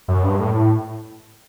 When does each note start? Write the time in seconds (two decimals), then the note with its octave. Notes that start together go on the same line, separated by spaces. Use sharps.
0.08 F#2
0.23 G2
0.40 A2
0.55 A2